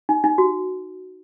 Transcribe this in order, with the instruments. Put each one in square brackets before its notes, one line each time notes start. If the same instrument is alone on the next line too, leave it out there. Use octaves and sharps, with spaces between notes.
[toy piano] D#4
D#4
F#4